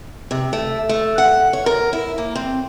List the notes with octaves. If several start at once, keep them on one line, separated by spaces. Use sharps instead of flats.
C3
A3
A3
F#5
C#5
A#4
E4
A#3
C4